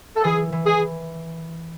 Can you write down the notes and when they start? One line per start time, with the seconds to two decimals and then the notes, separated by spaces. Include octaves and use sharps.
0.16 A4
0.24 E3 G#4
0.52 E3
0.66 G#4